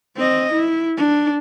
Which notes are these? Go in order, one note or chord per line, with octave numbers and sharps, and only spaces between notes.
C4 D#5
E4
D4